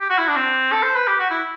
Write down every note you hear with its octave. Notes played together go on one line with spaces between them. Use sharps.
G4
F#4
E4
D4
C4
A4
C5
B4
G4
F#4
E4